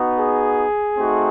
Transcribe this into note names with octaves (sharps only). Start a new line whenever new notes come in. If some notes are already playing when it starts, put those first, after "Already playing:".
Already playing: B3 D#4 F#4
G#4
A3 C4 D#4 F#4